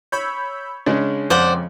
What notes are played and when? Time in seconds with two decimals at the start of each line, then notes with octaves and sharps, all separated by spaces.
0.12 C#5 B5 E6 G6
0.86 C#3 G#3 C#4 D4
1.30 F2 F3 C5 D5 F#5